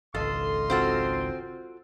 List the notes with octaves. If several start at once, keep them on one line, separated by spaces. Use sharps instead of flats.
G#1 C#2 A4 D#5 F5 C6
C4 F4 F#4 A4